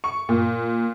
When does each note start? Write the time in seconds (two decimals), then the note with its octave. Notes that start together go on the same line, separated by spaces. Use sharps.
0.04 C#6
0.29 A#2